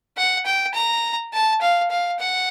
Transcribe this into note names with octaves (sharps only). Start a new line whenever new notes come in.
F#5
G5
A#5
A5
F5
F5
F#5